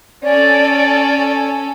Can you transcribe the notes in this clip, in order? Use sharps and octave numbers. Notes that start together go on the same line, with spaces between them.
C#4 A4 D5